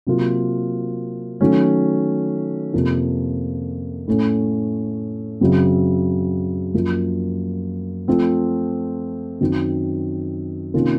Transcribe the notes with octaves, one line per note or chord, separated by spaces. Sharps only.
C3 F#3 A#3 F4
D#3 F#3 A3 C#4
F2 C3 F3 A#3
A2 A3 C#4
F#2 C#3 F#3 C4
F#2 F3 A#3
F3 A3 C4
F#2 D#3 F#3 C4
C3 D#3 A#3 C#4 F4